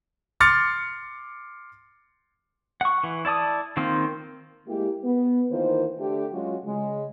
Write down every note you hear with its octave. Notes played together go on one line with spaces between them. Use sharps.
C6 D6 F6 A6 C#7
F#5 C#6
E3
E4 D5 A5 D#6
D#3 A#3 C4 F4
G#3 A#3 E4 G4
B3
D#3 E3 A#3 F4 C5
D3 A3 G4
F#3 G#3 C#4 F4 F#4
C#3 G#3